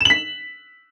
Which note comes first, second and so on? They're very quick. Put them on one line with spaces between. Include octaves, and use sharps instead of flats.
E7 F#7 B6